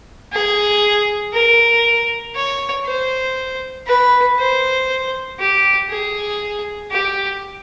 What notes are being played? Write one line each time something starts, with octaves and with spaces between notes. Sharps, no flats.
G#4
A#4
C#5
C5
B4
C5
G4
G#4
G4